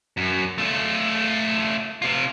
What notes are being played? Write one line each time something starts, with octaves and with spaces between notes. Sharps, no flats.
F#2
A3 F4
C3 F4